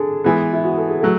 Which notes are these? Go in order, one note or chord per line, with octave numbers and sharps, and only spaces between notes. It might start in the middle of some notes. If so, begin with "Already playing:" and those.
Already playing: D3 D4 G#4 A4
E3 G#3 B3
E4
F#4
A4
G#4
A4
F#3 A3 G#4